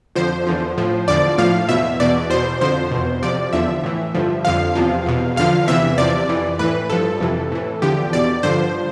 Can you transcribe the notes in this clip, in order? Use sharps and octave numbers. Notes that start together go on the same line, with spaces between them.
F2 D3 F3 C5
E2 D3 F3
A2 F3
E2 D3 F3 D5
A2 F3 F5
E2 B2 E5
E2 B2 D5
E2 B2 C5
F2 D3 F3 C5
E2 B2
F2 C3 F3 D5
E2 D3 F3 E5
A2 E3
G2 D3 F3
F2 D3 F3 F5
E2 C3 F3
E2 B2
E2 D3 F3 F5
E2 C3 E3 E5
E2 C3 F3 D5
F2 E3
A2 E3 B4
G2 F3 A4
F2 C3 E3
A2 E3
E2 D3 F3 G4
E2 B2 D5
G2 D3 F3 C5